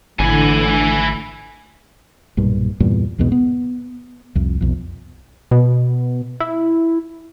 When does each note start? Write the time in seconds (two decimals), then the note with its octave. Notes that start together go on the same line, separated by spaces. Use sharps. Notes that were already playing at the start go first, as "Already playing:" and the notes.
0.19 G#1 A2 D3 E3 E4 G#5
2.37 B1 G2 A#2
2.80 E2 G2 A#2
3.18 B1 E2 G#2 B2
3.32 B3
4.35 C2 F2
4.61 B1 F2
5.51 B2
6.40 E4